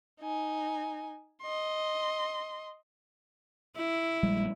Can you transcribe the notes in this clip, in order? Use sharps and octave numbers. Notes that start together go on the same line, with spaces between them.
D#4 G#5
D#5 C6
E4
A#1 G3 G#3